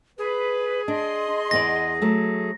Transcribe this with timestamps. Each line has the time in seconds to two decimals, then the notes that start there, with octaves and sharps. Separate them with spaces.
0.18 G#4 B4
0.88 D4 D#5 C6
1.51 E2 B3 D5 A#6
2.02 F#3 A3